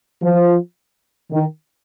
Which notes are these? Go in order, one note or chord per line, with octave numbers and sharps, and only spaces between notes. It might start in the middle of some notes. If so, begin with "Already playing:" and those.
F3
D#3